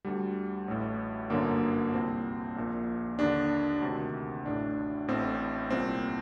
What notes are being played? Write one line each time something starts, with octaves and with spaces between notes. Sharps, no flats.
D2 D3 G3
A1 A2
G1 F#2 D3 A#3
C2 A#2 C4
A#1 A#2
D#2 D3 D4
D2 C3 D#3
A1 A2 D4
A1 A2 C4
C2 A#2 C4